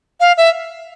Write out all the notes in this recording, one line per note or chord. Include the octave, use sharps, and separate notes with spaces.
F5
E5